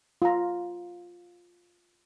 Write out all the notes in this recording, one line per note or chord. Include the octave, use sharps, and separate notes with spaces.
F4 A#5